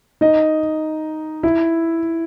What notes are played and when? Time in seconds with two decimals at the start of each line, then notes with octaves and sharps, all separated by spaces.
0.21 D#4 D#5
1.43 E4 E5